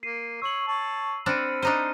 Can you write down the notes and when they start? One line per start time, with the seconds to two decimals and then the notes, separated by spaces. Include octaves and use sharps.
0.03 A#3 C7 D#7
0.42 C#5 E6 F#7
0.68 C#5 A5
1.26 C4 D4 B5 F6 C#7 D#7
1.62 D4 D#4 C5 F6 D#7